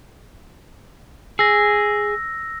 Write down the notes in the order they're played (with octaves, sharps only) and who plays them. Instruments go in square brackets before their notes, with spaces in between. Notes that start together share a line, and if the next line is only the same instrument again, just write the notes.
[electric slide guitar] G#4 [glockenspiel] E6 A#6